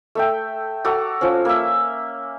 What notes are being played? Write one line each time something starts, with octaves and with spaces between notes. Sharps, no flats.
A3 E5 G5
F#4 A4 D5 A#5
F3 C#4
A#3 E5